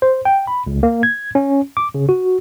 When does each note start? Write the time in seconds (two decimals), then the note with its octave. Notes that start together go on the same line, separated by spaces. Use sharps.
0.02 C5
0.25 G5
0.47 B5
0.67 C#2
0.83 A#3
1.03 G#6
1.35 C#4
1.77 D6
1.94 C#3
2.09 F#4